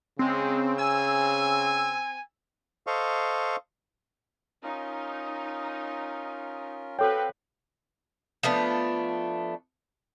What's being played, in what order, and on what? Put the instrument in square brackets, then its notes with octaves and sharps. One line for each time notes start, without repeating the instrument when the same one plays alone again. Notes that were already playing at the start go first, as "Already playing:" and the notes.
[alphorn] C#3 [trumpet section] G#3 [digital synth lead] C4
[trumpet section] C4 G#5 [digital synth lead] E6
[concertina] A4 C5 D#5 F5 C#6
[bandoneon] C#4 F4 A#4 [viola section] D#4
[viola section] C4 F#4 B4 [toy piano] A4 C#5 [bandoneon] F5 [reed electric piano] G5
[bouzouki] F3 A3 B3 D4